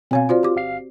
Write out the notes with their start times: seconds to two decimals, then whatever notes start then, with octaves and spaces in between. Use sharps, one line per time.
0.11 B2 C4 C#5 F5 G#5
0.29 F4 F#4 C5 D5
0.43 G4 D6
0.56 G1 F5 C7